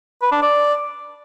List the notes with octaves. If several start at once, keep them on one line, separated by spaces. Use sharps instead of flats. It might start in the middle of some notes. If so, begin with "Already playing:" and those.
B4
D4
D5